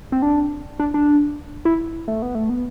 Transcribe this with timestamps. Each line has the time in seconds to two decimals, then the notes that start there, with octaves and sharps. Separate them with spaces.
0.12 C4
0.22 D4
0.80 D4
0.94 D4
1.65 E4
2.08 A3
2.22 B3
2.35 A3
2.49 B3